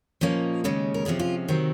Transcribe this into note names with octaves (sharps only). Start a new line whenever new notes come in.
A#2 F3 A#3 C#4 D#5
D#2 C#3 G#3 C#4
A#4
C3 F3 G#3 C#4 G#4
F4
C3 D#3 F#3 C4